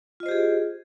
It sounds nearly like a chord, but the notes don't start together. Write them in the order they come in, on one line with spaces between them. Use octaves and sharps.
F4 D#5 C5 G4 G#4